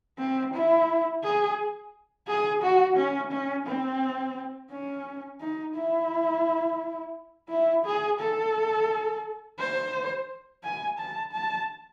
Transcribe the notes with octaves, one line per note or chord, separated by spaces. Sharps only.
C4
E4
G#4
G#4
F#4
C#4
C#4
C4
C#4
D#4
E4
E4
G#4
A4
C5
G#5
A5
A5